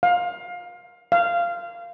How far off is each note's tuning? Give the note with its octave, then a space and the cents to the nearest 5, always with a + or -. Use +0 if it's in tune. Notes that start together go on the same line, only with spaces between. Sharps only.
F5 +25
F5 -15